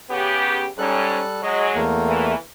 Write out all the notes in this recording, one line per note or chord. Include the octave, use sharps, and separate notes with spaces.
C#3 B3 G4
G#2 G3 C#4 A4 F#6
F#3 G#3 D#5
E2 A3 A#3
E3